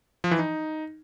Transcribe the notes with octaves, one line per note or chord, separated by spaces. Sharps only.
F3
E3
D#4